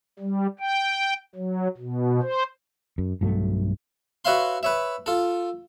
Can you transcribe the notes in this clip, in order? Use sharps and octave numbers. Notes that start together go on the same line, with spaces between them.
G3
G5
F#3
B2
C5
F#2
B1 G2 F#3 A3
F#4 B4 C#5 E5 F5 C6
B4 C#5 E5
F4 A4